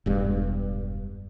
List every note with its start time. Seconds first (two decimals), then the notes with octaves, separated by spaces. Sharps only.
0.06 E1 G2